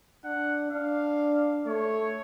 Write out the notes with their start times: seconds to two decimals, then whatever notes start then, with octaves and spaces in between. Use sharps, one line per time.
0.24 D4 F#5
0.71 D4 F5
1.66 A3 C#5